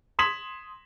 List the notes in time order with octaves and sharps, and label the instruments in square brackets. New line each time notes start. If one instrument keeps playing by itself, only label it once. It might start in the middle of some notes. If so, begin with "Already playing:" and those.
[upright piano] C6 D#6 G#6 B6 E7 F#7